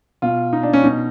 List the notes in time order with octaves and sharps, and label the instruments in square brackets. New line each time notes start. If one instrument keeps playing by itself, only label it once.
[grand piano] B2 F4
D#4
D4
C#4
B2 D#4